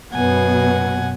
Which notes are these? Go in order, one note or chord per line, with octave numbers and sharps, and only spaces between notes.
F#2 B2 B3 F#5 G#5